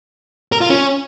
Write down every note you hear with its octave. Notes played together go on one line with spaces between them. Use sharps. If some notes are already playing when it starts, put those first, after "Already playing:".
A#4
F4
C#4